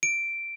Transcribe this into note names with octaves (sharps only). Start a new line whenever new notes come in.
D7